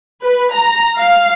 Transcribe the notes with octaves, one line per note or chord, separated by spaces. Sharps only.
B4
A#5
F5